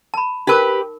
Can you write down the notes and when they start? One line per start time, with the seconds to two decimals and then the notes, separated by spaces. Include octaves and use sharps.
0.14 A5 B5
0.47 D#4 G4 A#4 B4 D6